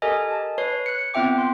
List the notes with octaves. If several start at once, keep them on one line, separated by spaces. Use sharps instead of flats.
G4 A4 A#4 D#5 G#5
A5
B4 C#5 C7
F#6 C#7
B3 C4 F4 E5 G5 D6
C6